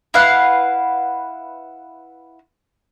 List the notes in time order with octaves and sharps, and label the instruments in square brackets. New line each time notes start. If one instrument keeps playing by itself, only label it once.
[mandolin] E4 B4 F5 F#5